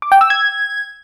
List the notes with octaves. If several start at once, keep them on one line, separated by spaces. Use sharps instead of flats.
D6
G5
E6
G#6